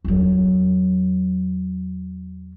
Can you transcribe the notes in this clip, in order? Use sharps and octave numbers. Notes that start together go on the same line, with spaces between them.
E2 F#3